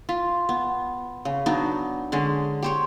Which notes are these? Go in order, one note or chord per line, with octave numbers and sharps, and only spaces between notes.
F4
B3
C#3
F#3 B3 D4 D#4
D3 G#3 C#4
G4 C5 C#5